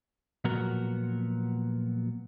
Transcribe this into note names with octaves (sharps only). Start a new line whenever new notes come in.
A#2 F3 F#3 B3 F#4 A#4